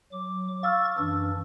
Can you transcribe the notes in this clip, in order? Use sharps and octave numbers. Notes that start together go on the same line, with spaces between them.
F#3 D6
F5 C#6 E6 F6 A6
F#2 E3 D4 E6